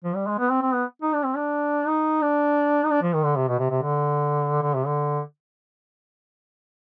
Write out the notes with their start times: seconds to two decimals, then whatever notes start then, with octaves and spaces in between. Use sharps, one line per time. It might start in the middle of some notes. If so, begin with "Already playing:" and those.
0.04 F3
0.15 G3
0.27 G#3
0.39 B3
0.50 C4
0.62 C4
0.73 B3
1.02 D#4
1.14 D4
1.24 C4
1.36 D4
1.87 D#4
2.22 D4
2.84 D#4
2.90 D4
3.02 F3
3.14 D#3
3.25 D3
3.36 C3
3.48 B2
3.59 C3
3.71 C3
3.82 D3
4.62 D3
4.75 C3
4.87 D3